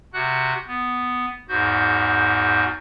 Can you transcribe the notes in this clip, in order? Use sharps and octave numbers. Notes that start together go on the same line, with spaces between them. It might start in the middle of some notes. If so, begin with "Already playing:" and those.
C3 F#4 F#5 F#6
B3
E2 G#2 F#4 G6